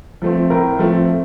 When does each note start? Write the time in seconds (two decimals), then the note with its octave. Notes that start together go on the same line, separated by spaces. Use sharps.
0.22 F3 A3 C4
0.50 A2 A#4
0.79 F3 A3 C4